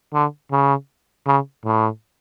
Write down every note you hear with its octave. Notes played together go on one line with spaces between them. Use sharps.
D3
C#3
C#3
A2